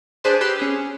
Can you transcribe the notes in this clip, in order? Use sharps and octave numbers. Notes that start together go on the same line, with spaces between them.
D4 G#4 B4 C5 A5 C6
G4 B4 C6 E6
C#4 G#4